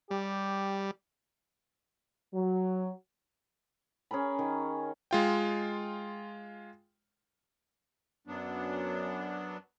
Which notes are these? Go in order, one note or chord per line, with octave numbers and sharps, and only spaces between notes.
G3 G4
F#3
C#4 G#4 A#4 B5
D#3
G#3 F4 G5
F#2 F#3 B3 D4